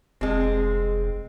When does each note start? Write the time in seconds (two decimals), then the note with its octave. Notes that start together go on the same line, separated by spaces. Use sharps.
0.21 F1 G#3 C4